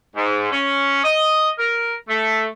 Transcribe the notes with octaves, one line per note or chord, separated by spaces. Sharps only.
G#2
C#4
D#5
A#4
A3